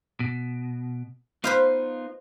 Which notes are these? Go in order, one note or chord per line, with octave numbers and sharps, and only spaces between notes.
B2
B3 D#4 F4 B4 C5 F5